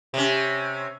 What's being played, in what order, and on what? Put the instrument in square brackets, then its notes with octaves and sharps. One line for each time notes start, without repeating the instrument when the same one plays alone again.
[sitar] C3 C#4